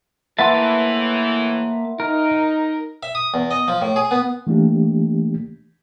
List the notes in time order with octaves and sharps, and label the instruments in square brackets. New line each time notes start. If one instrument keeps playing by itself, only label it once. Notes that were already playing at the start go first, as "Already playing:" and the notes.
[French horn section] A2 E3 [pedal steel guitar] A#3 B4 A5 [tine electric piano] E5 F#5 C6
[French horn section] D#4 [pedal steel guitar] A#4
[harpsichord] E5
D#6
E2
D#5
F3
A2
G#4
B3
[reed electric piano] E3 A3 A#3 D4 G4